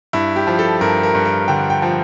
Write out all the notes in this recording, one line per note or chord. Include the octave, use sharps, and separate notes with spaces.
G2 E4
G4
F3
A4
G2 A#4
A#4
G2
A#4
D3 G5
G5
F3